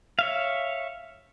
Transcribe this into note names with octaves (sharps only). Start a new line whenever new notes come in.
C#5 E5 F5